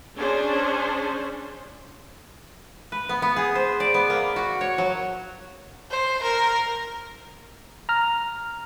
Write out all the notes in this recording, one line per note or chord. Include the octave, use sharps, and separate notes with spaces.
C#4 D4 G#4 C5
B4
B3
B3
G#4
C5
D5
B3
A#3
F#4
C#5
F#3
C5
A#4
A#5 F6